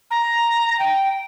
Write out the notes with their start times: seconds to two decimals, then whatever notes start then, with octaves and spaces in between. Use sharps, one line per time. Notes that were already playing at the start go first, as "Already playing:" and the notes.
0.11 A#5
0.79 G5